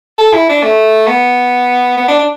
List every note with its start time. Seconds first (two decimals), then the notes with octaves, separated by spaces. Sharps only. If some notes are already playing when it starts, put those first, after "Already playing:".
0.18 A4
0.33 E4
0.49 D4
0.63 A3
1.08 B3
1.97 B3
2.08 D4
2.19 D4